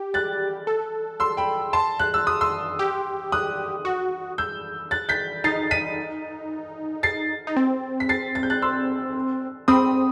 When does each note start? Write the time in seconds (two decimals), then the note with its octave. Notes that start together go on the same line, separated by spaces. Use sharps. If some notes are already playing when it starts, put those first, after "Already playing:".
Already playing: G4
0.14 F#6 A6
0.67 A4
1.20 C6 E6
1.37 G5 B5
1.73 A5 C6
2.00 F#6
2.14 E6
2.27 D#6
2.41 C6 E6
2.79 G4
3.32 D#6 F#6
3.85 F#4
4.38 E6 G6
4.91 F#6 A6
5.09 G6 B6
5.44 D#4 A6 C7
5.71 B6 D#7
7.03 A6 C7
7.47 D#4
7.57 C4
8.00 B6
8.09 A6 C7
8.35 A6
8.43 G6
8.50 F#6 A6
8.62 C6 E6
9.68 C4 B5 D#6